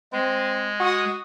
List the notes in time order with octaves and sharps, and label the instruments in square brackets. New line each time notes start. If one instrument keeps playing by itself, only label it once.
[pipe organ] G#3 [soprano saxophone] C4
[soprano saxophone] F#4 [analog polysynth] F#5 D#6